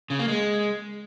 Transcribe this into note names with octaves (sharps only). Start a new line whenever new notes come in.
C#3
A#3
G#3